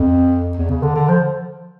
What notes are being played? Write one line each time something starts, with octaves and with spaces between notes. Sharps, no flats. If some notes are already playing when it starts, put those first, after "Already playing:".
Already playing: F2
E2
C#3
D3
D3
F3